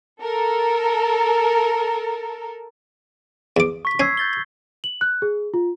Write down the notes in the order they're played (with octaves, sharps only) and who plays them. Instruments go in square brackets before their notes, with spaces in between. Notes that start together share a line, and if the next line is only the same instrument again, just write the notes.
[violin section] A4 A#4
[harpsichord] E2 D6
[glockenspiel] C#6 B6
[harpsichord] C#4 [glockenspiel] E6 G#6 C7
[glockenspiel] G6 A6 G7
[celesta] F#7
F#6
G#4
F4